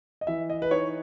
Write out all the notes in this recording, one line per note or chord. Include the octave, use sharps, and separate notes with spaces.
D#5
E3 E5
D#5
B4
D#4 C#5